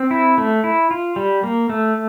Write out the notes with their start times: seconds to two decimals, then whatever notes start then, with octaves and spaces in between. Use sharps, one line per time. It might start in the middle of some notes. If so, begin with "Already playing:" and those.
Already playing: C4
0.11 E4
0.38 A3
0.64 E4
0.91 F4
1.16 G3
1.43 A#3
1.69 A3